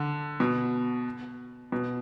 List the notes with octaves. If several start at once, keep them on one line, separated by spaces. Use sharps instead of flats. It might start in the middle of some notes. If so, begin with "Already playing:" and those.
Already playing: D3
B2
B2